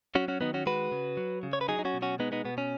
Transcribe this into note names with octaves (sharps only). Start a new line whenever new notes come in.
F#3 C#4 F#4
C#4 F#4
D#3 B3 D#4
C#4 F#4
G#3 F#4 B4
C#3
F#3
C#3
C#5
B4
F#3 D#4 G#4
D#4
C#4 F#4
B2
C#4 F#4
G#3 B3 D#4
B3 D#4
B2 B3
C#4